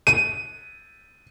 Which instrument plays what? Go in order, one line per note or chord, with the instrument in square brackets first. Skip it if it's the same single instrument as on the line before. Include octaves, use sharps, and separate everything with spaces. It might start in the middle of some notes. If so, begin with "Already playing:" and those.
[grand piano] D#7